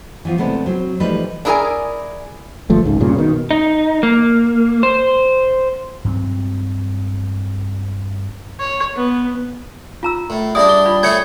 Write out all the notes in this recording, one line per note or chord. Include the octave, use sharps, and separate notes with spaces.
E3 F3 B3 F4
C3 G#3 A3 B3 D4 E4
F#3 C4
E3 F3 G3 A3 D#4 B4
D4 E4 G#4 A#4 D5 G#5
G1 F3 A3
C#2 G#2
G2 A#2 C#3
B2 D#3
D#4
A#3
C5
G2 F#3 C4
C#5
B3
F4 A#5 E6
A2
G3 D4 G#4 D5 E5 D#6
G7
F4 D5 B5
A3 E4 G#4 C#5 G#6 C#7